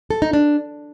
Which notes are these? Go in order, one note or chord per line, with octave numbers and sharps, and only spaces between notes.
A4
D#4
D4